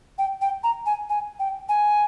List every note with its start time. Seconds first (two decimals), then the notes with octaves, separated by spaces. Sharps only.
0.18 G5
0.42 G5
0.64 A#5
0.86 G#5
1.10 G#5
1.39 G5
1.69 G#5